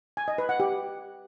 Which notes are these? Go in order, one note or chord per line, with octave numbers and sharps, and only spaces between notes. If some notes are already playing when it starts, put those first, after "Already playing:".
G#5
D#5
B4
F#5
G4